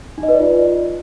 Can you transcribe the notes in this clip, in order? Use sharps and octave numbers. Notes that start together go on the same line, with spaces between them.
D#4
D#5
B4
D5
F4